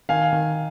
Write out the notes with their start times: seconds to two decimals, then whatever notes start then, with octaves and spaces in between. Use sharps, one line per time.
0.09 D#3 F5 G#5
0.33 D#3